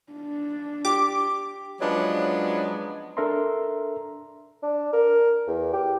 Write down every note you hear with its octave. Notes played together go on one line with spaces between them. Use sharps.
D4
G4 D6
F3 F#3 G#3 B3 C#4 D4
D4 A4 A#4 E5 A#5 C6
D4
A#4
E2
G4